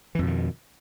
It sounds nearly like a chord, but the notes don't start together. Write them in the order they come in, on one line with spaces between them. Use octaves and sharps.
E3 F2 B2 D#3